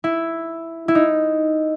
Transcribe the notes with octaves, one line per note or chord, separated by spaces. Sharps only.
E4
E4
D#4